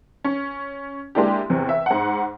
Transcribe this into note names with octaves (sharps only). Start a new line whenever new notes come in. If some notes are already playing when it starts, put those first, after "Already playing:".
C#4
G#3 A#3 D4 E4 G4
E2 C3
E5
G#2 F#5